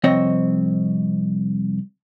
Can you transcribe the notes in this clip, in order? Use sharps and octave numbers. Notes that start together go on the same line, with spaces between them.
C2 F2 C4 C#5 D#5